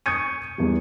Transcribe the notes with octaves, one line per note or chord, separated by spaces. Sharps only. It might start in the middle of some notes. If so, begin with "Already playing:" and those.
C#6 D#6 G6 G#6 C#7 D#7
E2 G3